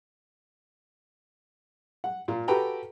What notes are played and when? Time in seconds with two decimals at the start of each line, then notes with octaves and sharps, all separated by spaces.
2.04 F#5
2.28 A#2 F4
2.48 F#4 G4 A4 B4 G5 A#5